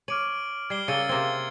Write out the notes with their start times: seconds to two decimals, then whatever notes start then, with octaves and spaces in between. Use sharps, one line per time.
0.08 C#5 D6 F6 D7 D#7 F#7
0.70 G3 G#6 C7 G7
0.88 C#3 A#3 F5 E6 A6 C#7 D#7 G7
1.09 C3 A#3 C4 G#6